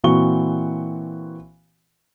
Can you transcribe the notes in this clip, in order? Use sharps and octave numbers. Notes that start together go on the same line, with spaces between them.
A#2 E3 C4 F#4 C#6 G7